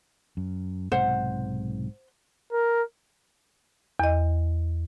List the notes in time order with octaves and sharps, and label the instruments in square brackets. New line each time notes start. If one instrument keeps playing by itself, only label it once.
[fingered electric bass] F#2
[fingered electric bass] B1 G#2 C3 [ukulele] C5 F#5
[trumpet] A#4
[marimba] E2 D#5